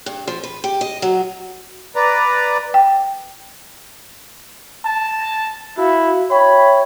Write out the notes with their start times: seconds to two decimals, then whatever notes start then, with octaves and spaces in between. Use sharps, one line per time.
0.06 G2
0.27 F3
0.43 B4
0.64 G4
0.81 D#5
1.02 F#3
1.96 B4 D5 A#5
2.74 G5
4.85 A5
5.77 E4 F#4 F5
6.30 C#5 E5 G5 B5 C#6